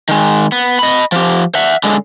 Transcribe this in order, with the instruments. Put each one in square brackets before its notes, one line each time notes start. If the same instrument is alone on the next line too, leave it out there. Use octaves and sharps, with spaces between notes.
[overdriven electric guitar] D#3 G#3
B3
D#5 B5
F3 G4
E5 F#5
D3 G#3